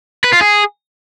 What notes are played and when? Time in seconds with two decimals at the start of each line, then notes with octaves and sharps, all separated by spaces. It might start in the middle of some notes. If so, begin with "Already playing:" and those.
0.24 B4
0.33 F4
0.41 G#4